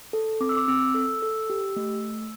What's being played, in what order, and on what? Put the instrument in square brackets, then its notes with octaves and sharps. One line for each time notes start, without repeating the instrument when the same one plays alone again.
[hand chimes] A4
C4 D6
E6
D6
C4 E6
A4 E6
A4
G4
A3